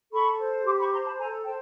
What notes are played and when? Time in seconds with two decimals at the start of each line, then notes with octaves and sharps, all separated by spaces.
0.12 A4 B5 C#6
0.39 C5
0.65 G4 C6 D6
0.79 B5 C#6
0.92 C5 A#5 C6
1.05 A5 B5
1.19 A4 G#5 A#5
1.45 C5 G5 A5